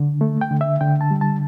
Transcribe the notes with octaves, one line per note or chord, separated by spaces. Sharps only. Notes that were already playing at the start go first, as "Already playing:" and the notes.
Already playing: D3
A3
G5
D3
E5
D3 G5
A5
G3
A5